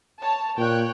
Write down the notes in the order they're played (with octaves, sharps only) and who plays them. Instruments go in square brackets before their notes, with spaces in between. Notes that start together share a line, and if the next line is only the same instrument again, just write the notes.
[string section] C#5 A5
[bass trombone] A#2 [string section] C#5 G5 F#6